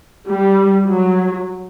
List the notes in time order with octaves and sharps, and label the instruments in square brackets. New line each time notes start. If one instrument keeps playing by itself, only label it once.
[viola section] G3
F#3